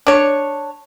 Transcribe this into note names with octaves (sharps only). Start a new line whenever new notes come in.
D4 C#5